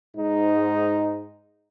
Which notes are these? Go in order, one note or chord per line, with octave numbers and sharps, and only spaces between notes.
G#2 D#4